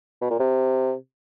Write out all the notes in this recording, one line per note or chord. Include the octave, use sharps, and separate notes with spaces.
B2
A#2
C3